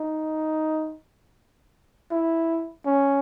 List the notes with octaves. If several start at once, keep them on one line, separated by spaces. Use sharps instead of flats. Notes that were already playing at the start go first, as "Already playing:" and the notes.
Already playing: D#4
E4
C#4